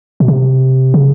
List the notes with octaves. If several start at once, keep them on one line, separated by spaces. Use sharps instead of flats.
B2
C3
C#3